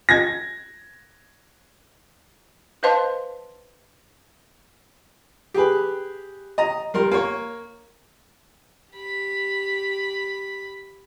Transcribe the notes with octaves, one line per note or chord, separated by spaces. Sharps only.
G#6 A#6
B4 C5 D#5 F5 A5 C6
G4 G#4 B4
D#5 A#5
G3 A#4 C6
A#3 C#5
G4 B5